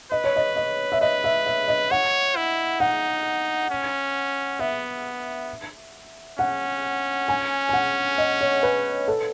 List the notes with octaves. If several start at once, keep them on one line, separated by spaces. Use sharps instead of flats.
B4 D#5
C#5
D#5
D#5
E5
B4 D#5
E5
E5
D#5
C#5 F#5
E4
D#4 F#5
C#4
B3 E5
C#4 F#5
G#5
G#5
F#5
D#5
C#5
B4
A4